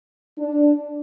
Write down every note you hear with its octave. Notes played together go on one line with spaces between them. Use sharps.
D4